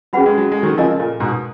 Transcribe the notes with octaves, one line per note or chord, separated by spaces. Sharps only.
F#3 C#4 G#4 B4 F#5 B5
G#3
F#3
G#3
D#3 F#3
C#3 F3 A#4 D#5 G#5
A#2
G#2 B2